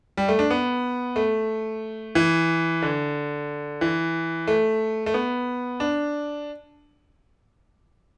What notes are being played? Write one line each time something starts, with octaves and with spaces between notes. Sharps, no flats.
G3
A3
D4
B3
A3
E3
D3
E3
A3
A3
B3
D4